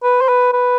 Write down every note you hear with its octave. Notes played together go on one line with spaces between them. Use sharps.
B4
C5
B4
B4